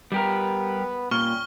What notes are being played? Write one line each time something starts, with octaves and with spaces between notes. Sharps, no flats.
G3 B3 G4 A#4 B4
A#2 G3 C#4 C#6 F6 G7